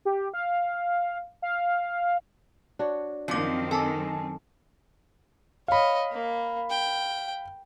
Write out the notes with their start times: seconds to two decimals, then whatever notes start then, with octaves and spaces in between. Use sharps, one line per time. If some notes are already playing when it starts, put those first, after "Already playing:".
0.05 G4
0.34 F5
1.42 F5
2.79 D4 F#4 C#5
3.28 F#2 D#3 F3 C4 C#4 D6
3.71 A4 G#5 A5 D6
5.68 C#5 D#5 F5 B5
6.12 A#3
6.70 G5